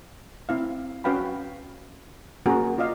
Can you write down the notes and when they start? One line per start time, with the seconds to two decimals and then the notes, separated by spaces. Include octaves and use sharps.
0.49 C4 E4 F5
1.04 C#4 F#4 B4 F5 G5 B5
2.46 A#3 C#4 F#4 G#4 A#4
2.78 F4 D5 D#5 F5